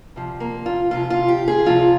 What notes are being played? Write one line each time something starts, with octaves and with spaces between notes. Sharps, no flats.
D2 C3 F3
A#3
F4
D2 C3 F3 F4
F4
G4
G#4
D2 C3 F3 F4